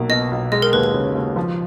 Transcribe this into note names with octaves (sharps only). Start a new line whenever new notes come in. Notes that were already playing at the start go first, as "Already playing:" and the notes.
Already playing: B1 A#3
B2 D#5
B1
G#3 D#5
A#4
D#2 B4
B4
C#3
D#2
F3